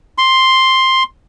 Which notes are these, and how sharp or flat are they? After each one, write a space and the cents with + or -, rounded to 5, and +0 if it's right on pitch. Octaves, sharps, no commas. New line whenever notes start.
C6 +5